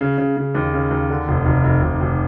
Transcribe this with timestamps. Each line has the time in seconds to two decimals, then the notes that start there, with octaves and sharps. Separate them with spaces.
0.01 C#3
0.18 C#3
0.37 C#3
0.55 D#2
0.73 C#3
0.91 D#2
1.10 D3
1.28 F1
1.46 F1
1.64 F1
1.82 F1
2.01 F1